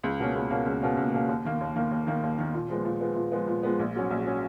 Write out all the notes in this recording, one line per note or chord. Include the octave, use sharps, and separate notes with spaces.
C#2
B2 A#3 C#4
C#2
B2 A#3 C#4
C#2
B2 A#3 C#4
C#2
B2 A#3 C#4
D#2
D#3 A#3
D#2
D#3 A#3
D#2
D#3 A#3
D#2
D#3 A#3
A#2
F3 G#3 B3
A#2
F3 G#3 B3
A#2
F3 G#3 B3
A#2
F3 G#3 B3
A#1
G#2 F#3 C#4
A#1
F#3 C#4